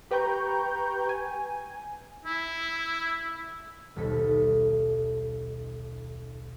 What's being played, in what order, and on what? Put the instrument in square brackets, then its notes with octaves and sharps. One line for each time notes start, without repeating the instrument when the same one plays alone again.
[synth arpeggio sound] G4 B4 G5 A#5 C#6 G6
G#5
[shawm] E4
[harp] D#1 B1 A4 B6